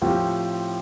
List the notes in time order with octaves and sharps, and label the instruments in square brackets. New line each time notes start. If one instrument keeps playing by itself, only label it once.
[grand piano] A2 F3 C4 G4